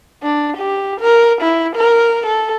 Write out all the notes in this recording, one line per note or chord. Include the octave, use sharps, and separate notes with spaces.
D4
G4
A#4
E4
A#4
A4